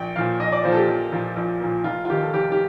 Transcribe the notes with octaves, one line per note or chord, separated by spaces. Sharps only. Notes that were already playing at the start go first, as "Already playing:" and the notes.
Already playing: A#1 G5
A#2 F3 A#3 F5
A#1 D#5
D5
A#2 F3 A#3 C5
A4
G4
A#1
A#2 F3 A#3
A#1
A#2 F3 A#3
F1 F4
F4
D#2 D#3 G4
A4
F1 G4
G4